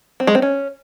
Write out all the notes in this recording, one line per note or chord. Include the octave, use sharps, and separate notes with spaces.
C4
G#3
C4
C#4